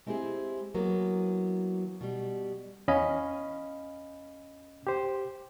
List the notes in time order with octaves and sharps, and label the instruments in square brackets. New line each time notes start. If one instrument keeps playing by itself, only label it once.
[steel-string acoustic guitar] G#3 C4 E4 G4 G#4
E3 F#3 A#3 B3
B2 G3
[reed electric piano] E2 C#4 D#5 F5 B5
G4 C5